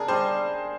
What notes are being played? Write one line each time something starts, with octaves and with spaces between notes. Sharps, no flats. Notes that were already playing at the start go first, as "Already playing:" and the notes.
Already playing: D4 G#4 A#4
G3 C5